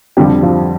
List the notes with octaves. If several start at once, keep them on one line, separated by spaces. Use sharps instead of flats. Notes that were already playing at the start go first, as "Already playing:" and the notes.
F2 D3 F3 G3 G4
F3 F4